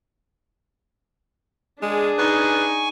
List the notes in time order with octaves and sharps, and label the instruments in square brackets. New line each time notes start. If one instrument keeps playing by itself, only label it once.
[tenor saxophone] G#3 [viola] D4 G#4
[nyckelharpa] D#4 [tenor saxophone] B4 [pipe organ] G#5 C#6